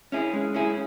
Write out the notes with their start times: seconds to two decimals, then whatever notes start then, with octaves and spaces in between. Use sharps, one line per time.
0.12 C#4 E4 G#4
0.33 G#3
0.54 C#4 E4 G#4